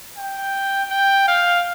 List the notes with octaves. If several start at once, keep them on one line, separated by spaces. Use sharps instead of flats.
G5
G5
F5